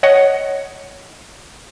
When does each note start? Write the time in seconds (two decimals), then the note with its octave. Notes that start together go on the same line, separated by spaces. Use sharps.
0.03 C#5 D#5 F#5